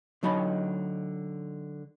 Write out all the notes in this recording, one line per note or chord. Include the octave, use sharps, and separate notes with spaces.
D3 F#3 D#4 D#5 B5